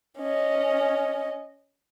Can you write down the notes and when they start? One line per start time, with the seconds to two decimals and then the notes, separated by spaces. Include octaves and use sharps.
0.18 C#4 D#5